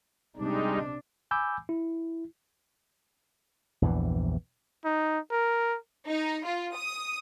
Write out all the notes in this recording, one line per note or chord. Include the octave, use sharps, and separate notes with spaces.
C3 G3 G#3 D4 D#4
G#5 B5 D6 E6 G6
E4
A#1 E2 G2 E3
D#4
A#4
D#4
F4
D#6